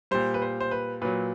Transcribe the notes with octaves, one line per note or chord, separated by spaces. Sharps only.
A#2 G3 C5
B4
C5
C5
B4
A#2 F#3 B4